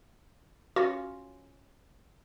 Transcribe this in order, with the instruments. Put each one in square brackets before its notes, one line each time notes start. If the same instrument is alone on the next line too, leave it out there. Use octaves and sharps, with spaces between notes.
[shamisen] C#4 F4 [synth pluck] F#4